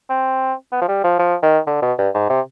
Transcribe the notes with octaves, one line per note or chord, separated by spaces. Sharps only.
C4
B3
F3
G3
F3
F3
D#3
D3
B2
G2
G#2
C3